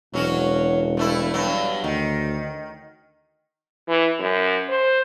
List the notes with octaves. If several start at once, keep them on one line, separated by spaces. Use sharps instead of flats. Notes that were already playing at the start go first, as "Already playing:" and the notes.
E1 F#3 C#4 F#4
G2 A3 E4
G2 F#3
D2 D#3
E3
F#2
C5